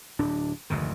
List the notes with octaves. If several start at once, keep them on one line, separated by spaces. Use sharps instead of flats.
D1 D4
F1 D2 G#2 D#3